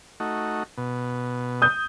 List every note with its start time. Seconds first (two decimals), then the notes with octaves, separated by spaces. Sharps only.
0.20 A3 D#4 F#4
0.78 B2
1.62 D#6 G6